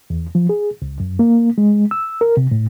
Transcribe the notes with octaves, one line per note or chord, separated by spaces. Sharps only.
E2
F3
G#4
C#2
F#2
A#3
G#3
E6
A#4
C3
A2